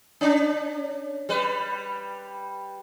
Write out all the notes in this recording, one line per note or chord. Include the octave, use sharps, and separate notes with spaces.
C#4 D4
G3 B4